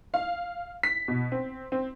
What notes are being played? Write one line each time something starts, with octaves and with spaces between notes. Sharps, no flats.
F5
B6
B2
C4
C4